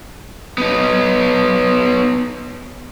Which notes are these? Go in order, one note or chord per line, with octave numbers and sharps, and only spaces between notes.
B3 D#4